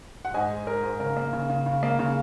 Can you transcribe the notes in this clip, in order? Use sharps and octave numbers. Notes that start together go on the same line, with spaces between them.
F#5
G#2 D#5 G#5
G#3
G#3 A#4
G#2
C#3 A#4
A#3
C#3
C#3
C#3
A#3
C#3